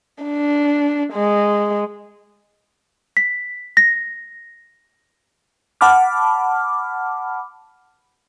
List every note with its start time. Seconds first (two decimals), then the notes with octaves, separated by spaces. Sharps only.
0.24 D4
1.13 G#3
3.17 B6
3.77 A#6
5.81 F#5 A5 B5 D6 F6